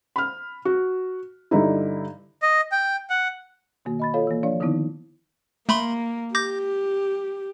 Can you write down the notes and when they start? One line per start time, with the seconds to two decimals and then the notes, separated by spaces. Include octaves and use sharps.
0.16 B5 F6
0.65 F#4
1.51 G2 D3 D#4 E4
2.42 D#5
2.72 G5
3.10 F#5
3.85 B2 D#3 A#3 F#4
3.99 D#5 B5 A6
4.14 F4 A4 C#5 F5
4.27 E3 A#3
4.43 F3 D4 C#5 D5 F5
4.60 D3 D#3 F3 B3 D#4 E4
5.69 A3 A#3 B5 C6
6.35 G4 D6 G6 A#6